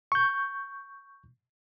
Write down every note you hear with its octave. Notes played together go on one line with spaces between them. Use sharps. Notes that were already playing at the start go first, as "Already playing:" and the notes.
C#6 G6